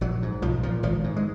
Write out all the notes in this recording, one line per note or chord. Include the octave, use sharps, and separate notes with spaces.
A#1 F#3
G#2
B1 F3
A#2 F3
G#1 F3
G#2
G#3